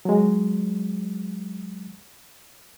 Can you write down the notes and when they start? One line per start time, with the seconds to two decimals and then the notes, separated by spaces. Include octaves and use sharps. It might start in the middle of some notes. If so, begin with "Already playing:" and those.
0.05 F#3 G#3